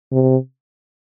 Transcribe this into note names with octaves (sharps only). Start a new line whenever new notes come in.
C3